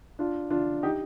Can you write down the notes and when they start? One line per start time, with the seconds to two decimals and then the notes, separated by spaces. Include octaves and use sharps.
0.19 D4 F4
0.50 D4 F4
0.83 D#4 G4